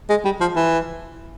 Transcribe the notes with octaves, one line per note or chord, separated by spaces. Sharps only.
G#3
G3
F3
E3